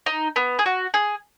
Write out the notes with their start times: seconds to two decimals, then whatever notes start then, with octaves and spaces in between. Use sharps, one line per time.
0.06 D#4
0.36 B3
0.59 G#4
0.66 F#4
0.94 G#4